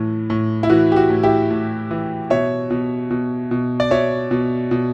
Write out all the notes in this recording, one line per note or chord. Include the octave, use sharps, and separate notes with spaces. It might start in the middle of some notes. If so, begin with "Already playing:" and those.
Already playing: A2 E3
A2
E4
E3 F#4
G4
F#4
A2
E4 G4
A2
E3
B2 C#5 E5
B2
B2
B2
D5
B2 C#5 E5
B2
B2